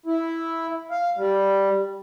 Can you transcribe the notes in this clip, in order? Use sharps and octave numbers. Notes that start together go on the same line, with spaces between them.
E4
F5
G3